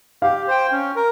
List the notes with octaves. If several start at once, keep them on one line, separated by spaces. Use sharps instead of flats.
G4 F5
C5 G5
C#4
A#4